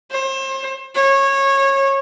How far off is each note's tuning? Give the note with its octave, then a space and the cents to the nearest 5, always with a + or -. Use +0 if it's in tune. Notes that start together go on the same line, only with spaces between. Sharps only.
C5 +35
C#5 -20